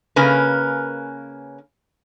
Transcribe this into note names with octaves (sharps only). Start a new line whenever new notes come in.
C#3 A#3 C#4 A#4 B4